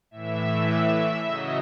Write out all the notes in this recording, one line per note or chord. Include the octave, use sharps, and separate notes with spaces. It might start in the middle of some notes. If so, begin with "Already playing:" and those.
A2 E3 E5
C#3 F#3 D#5